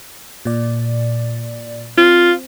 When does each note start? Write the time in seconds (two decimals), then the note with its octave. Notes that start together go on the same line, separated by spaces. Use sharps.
0.45 A#2 D5
1.97 C4 F4